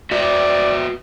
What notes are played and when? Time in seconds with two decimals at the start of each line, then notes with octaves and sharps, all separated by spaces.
0.11 F#4 B4 D5 E5